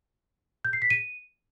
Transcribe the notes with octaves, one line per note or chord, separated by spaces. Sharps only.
G6
C7
B6
D#7